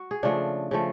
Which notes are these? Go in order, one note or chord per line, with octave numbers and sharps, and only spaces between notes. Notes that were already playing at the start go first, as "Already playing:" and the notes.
Already playing: F#4
G#4
C#3 F3 A3 D4
C#3 F3 A3